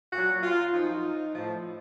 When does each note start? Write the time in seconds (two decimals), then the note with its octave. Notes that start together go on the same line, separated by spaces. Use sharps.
0.13 A#2 F#3 F#4
0.43 F4
0.74 F#2 F3 D#4
1.35 A2 F3